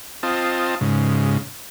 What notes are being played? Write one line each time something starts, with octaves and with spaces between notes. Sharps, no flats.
C4 F4 D#5 A5
G#2 C#3